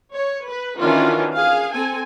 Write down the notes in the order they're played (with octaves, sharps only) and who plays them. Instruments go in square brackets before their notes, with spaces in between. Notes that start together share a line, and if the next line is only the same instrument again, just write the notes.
[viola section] C#5
B4
D#3 E3 C#4 D4 F4 F#4
G#4 F5
C4 A4 G#5